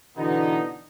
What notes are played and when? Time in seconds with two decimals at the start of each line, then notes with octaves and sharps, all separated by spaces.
0.17 B2 D3 E3 B3 D#4